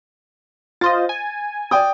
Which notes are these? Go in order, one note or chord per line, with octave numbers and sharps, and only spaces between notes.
F4 C5 D#5 A6
G#5
D5 G5 D#6